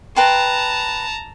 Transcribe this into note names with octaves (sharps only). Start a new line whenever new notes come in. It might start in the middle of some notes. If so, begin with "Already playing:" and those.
B4 G5 A5 A#5 C6